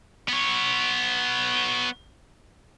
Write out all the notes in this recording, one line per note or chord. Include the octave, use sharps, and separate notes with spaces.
B3 C#5